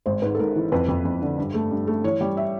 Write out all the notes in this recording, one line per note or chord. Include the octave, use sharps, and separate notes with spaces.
G#1 C5
G#2 B4
A4
G#2 A#4
E3
F2 B4
F2
F2
D3
G2
A3
G2
A3
E3 C#5
G3
E5